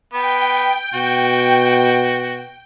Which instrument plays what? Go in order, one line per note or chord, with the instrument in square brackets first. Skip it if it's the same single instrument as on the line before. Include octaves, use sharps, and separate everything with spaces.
[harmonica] B3 [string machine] G5
[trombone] B2 [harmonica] F#4